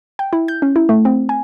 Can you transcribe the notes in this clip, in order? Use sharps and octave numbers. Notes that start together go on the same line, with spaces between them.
G5
E4
G6
C#4
E4
A3
C4
G#5